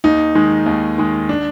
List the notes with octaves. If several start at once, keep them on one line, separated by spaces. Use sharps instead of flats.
D#2 D#4
D#3 G#3
D#2
D#3 G#3
D4